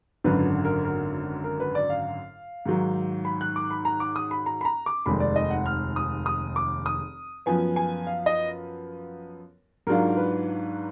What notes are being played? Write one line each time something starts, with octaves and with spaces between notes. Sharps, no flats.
G#1 F#2 D3 B4
A#4
A#4
A#4
B4
D5
F5
G#2 D#3 F#3
B5
F#6
D6
B5
A#5
D6
D#6
B5
A#5
B5
A#5
D6
F1 D#2 D#3 G#3 B5
D5
D#5
F#5
F6
D#6
D#6
D6
D#6
F#2 F3 B3 G#5
G#5
F5
D#5
G#2 F#3 D4 F4 A#4
B4